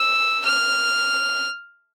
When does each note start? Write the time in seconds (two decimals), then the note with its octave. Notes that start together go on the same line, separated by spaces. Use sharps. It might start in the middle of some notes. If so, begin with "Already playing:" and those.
Already playing: E6
0.45 F6